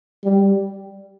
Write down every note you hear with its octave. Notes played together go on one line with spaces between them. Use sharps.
G3